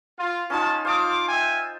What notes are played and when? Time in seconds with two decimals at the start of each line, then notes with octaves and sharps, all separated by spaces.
0.17 F4
0.50 C#4 D#4 F4 A5
0.85 C5 F5 A5 D6 D#6
1.29 E5 G5 G#5